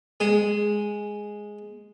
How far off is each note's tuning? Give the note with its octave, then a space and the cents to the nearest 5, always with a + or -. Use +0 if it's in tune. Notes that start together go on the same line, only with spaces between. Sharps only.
G#3 +0 G#4 +0